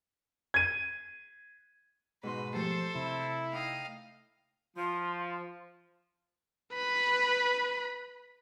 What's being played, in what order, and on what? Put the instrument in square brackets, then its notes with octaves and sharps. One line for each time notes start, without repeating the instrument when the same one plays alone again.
[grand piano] G#6 D#7
[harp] G#2 B2 C6 [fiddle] B4
[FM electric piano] F3 G4 C7 [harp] A3 [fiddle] A4 C5
[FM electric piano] C3 [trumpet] E4
[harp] D#4 G5 D#6 [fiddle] D#5 F5
[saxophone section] F3 [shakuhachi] C6
[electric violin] B4 B5